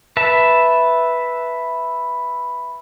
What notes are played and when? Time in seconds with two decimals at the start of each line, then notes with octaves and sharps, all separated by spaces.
0.17 B4 E5 A5